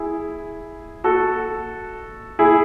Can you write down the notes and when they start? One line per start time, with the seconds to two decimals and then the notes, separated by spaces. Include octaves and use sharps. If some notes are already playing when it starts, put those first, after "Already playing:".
Already playing: E4 G#4
1.04 F#4 A4
2.39 E4 G#4